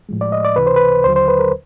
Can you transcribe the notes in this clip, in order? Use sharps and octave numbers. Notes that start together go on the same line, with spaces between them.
A2 F3 G#3
D5
D#5
D5
C#2 C3 E3 B4
C5
B4
D#2 D3 F#3 C5
C5
B4
A#4